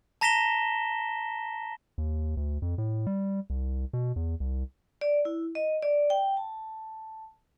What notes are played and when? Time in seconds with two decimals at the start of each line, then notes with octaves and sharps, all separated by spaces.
0.21 A5 A#5 A#6 B6 E7 G7
1.98 D#2
2.37 D2
2.62 F2
2.78 A2
3.07 G3
3.50 C2
3.93 B2
4.16 E2
4.40 C2
5.01 D5
5.25 E4
5.55 D#5
5.82 D5
6.10 G5
6.37 A5